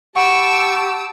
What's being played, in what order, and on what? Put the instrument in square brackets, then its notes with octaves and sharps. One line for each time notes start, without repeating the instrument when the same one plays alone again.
[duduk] G4 [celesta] F#5 B5 [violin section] A5 E6 D7 [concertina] C#6